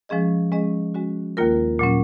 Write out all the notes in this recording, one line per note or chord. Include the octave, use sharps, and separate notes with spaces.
F3 G#3 C#4 G#4 D#5
G#3 C#4 G#4 D#5
G#3 C#4 F#4
D#2 D#3 A#3 F4 A#4
A#2 F#3 C#4